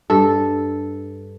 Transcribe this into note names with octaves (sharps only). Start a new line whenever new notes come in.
G2 A4